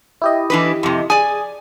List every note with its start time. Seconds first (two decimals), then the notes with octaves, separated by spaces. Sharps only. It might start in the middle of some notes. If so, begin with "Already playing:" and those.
0.22 E4 G4 D#5
0.50 E3 D4 B4
0.83 F2 C3
1.10 G#4 D5 G#5